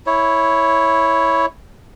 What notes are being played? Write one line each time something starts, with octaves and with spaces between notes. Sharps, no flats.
E4 C#5